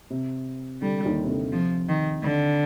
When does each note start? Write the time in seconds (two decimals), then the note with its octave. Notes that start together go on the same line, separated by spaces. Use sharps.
0.10 C3
0.82 D3 G3
1.05 D#2 D#3
1.24 C3
1.28 D3
1.52 C3 F3
1.89 D#3
2.24 D3